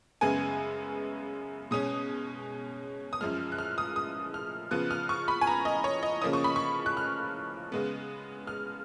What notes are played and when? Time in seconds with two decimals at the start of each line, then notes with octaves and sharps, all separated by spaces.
0.21 F#2 C#3 G#3 B3 G#5
1.71 B2 G#3 C#4 D#6
3.13 D#6
3.21 F#2 F3 G#3 F6
3.52 F#6
3.59 F6
3.78 D#6
3.96 D#6
4.34 F6
4.71 C#3 F3 B3 F#6
4.91 F6
5.09 C#6
5.28 B5
5.41 G#5
5.47 A#5
5.65 D#5
5.84 C#5
6.03 D#5
6.22 C#3 F3 A#3 C#4 D#6
6.33 C#6
6.44 B5
6.56 C#6
6.86 F#6
6.97 F6
7.72 C#3 G#3 B3
8.47 F6